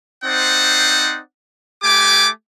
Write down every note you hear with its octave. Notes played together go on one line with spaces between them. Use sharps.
C4 D#4 C5 D5 F#5
A3 G4 G#5 D6